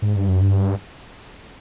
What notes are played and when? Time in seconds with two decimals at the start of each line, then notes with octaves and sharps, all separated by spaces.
0.02 G#2
0.16 G2
0.28 F#2
0.41 G2